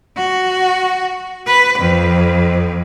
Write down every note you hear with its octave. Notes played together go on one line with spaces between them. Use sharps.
F#4
B4
F2